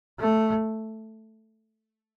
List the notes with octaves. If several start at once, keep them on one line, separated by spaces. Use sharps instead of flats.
A3